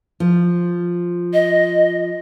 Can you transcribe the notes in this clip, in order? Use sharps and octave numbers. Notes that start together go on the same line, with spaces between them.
F3
D#5